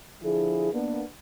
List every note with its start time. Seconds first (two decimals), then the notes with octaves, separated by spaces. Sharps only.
0.22 D3 F3 E4 G#4
0.73 A#3 B3 D4